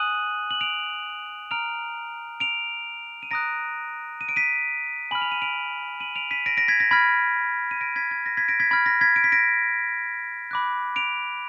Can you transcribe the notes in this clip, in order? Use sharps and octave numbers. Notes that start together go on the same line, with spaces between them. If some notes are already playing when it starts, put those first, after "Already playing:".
Already playing: G#5 D#6 F#6 D#7 F#7
F#7
D7 F7
A#5 F6 D7 F7
D7 F7
D#7
A#5 D#6 F#6 A#6 D7
D#7
D7
B6 D#7
G#5 B5 F6 F#7
F7
D#7
D7 F7
D#7 F#7
D7 F7
B6 D#7
A#6 D7
A#6 D7
G#6 B6
A#6
B5 F6 G#6 B6
D#7
A#6 D7
G#6 B6
G#6
A#6
G#6 B6
A#6 D7
G#6 B6
B5 F6 G#6
A#6
G#6 B6
D7
B6
A#6 D7
B5 D6 F#6
D7 F7